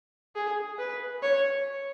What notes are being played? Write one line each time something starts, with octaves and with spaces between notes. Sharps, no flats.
G#4
B4
C#5